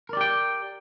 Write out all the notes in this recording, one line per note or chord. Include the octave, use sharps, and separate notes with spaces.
G4 A#4 D5 G5